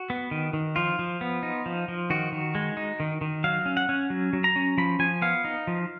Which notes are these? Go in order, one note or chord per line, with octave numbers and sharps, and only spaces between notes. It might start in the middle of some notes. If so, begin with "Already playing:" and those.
Already playing: F#4
B3
D#3
D#3
F3 F4
F3
B3
D#4
F3
F3
D#3 F#4
D#3
G#3
D#4
D#3
D#3
F#3 F5
C#4
F#5
C#4
F#3
F#3
A#5
C#4
F3 B5
F3 G#5
B3 F5
D#4
F3